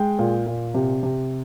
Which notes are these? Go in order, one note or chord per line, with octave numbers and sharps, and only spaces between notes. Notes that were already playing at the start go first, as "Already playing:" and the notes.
Already playing: G#3 G5
A#2
A#2
C3
C3